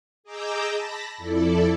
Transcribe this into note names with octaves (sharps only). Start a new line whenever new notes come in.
G#4 D#5 A#5 D6 E6 G6
A5 B5 A#6
F2 E4 A4 D5